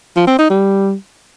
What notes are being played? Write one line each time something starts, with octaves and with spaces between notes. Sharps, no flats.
F3
C4
D#4
G3